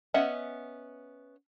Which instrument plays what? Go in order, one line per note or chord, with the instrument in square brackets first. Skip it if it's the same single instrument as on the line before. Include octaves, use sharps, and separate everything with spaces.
[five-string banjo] B3 C#4 D#5 E5 F#5